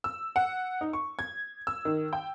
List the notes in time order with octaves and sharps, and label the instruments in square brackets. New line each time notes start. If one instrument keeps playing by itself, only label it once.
[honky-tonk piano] E6
F#5
D#4
C#6
G#6
E6
D#3
G5